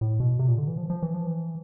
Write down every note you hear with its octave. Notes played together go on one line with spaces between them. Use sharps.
A2
B2
C3
A#2
D3
E3
F3
F3
E3
F3
E3